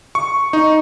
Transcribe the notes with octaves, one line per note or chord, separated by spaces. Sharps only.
C#6
D#4